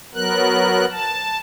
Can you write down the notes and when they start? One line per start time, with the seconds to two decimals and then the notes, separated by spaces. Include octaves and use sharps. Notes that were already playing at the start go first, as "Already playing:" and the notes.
0.14 F#3 B3 A#4 F#6
0.91 A5